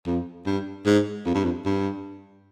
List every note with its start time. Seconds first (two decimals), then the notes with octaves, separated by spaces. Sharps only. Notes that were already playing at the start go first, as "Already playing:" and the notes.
0.06 F2
0.46 G2
0.86 G#2
1.26 F2
1.34 G2
1.44 F2
1.65 G2